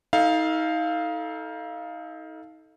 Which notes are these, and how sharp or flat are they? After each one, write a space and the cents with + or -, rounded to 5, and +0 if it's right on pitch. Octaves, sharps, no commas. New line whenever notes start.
D#4 +30 A4 +0 F5 +0